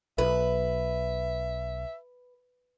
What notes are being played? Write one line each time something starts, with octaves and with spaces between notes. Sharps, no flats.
B1 B4 E5